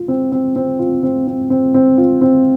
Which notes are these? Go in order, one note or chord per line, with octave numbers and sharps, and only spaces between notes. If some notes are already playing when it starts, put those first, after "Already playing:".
Already playing: F4
C4
C4
C4
F4
C4
C4
C4
C4
F4
C4